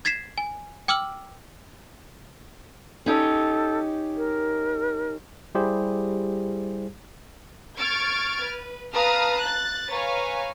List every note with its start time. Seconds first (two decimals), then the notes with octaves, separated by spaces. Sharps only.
0.05 G#6 A6 B6 C7 E7
0.38 G#5
0.88 G5 D6 E6 F6 F#7
3.06 C#4 D#4 G4 A4
4.17 A#4
5.55 G3 E4 G4 G#4 C5
7.79 C#6 F6 G#6 A6 D7
8.43 B4
8.95 B4 F5 A5 A#5 D#6 F6
9.41 F#6 A6
9.91 B4 C#5 F5 G#5 A#5